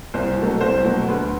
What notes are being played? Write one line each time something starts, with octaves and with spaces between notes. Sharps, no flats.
C2 C5
B2 F#3 A3
C2 C5
B2 F#3 A3
D2 B4